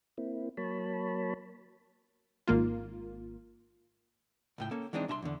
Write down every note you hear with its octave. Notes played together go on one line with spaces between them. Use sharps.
A#3 C4 E4
F#3 A#3 C#5 A5 B5
G#1 A#3 F4
C#2 A2 G5
A#3 C#4 A4
E3 G#3 C4 D4 D#4
C2 D4 E5 A#5 C6
E2 D3